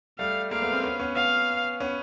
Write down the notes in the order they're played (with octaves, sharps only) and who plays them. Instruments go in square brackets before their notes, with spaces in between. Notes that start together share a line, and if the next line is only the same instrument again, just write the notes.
[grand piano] G3 A3 [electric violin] F5
[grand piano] G#3 A#3 [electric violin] F5
[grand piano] A3 B3
A#3 C4
B3 C#4
B3 C#4
[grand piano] B3 C#4 [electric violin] F5
[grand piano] B3 C#4